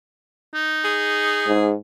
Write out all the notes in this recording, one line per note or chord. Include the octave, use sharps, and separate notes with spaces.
D#4
G#4
G#2